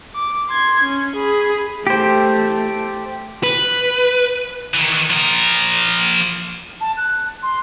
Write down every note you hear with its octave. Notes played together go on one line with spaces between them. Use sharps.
D6
C6 G#6
C#4
G#4 B5
A3 G4 C5
B4
D#3 E3
F3 A#4
A5
F#6
C6